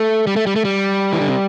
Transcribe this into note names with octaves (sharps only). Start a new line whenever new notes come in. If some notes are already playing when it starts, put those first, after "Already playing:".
Already playing: A3
G3
A3
G3
A3
G3
E3
D3
C3